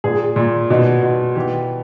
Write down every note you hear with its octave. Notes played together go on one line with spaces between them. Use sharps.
A#2 G#4
A#2
B2
B2
E3 G4